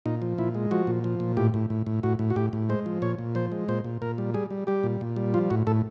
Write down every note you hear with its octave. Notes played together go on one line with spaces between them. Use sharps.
A#2 D#4
F3
A#2 E4
G#3
F3 F#4
A#2
F3
A#2
A2 G4
A2
A2
A2
A2 F#4
A2
F#4
A2 G4
A2
G#3 C5
F3
A#2 C#5
A#2
F3 C5
G#3
A#2 C5
A#2
A#2 A#4
G3
G3 G#4
G3
G3 G4
A#2
A#2
G3
F3 F4
A2 F#4
A2 A4